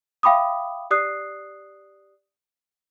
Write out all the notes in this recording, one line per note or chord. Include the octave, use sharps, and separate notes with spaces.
E5 F5 G5 B5 D6 D#6
G4 D5 D#6 F#6 C7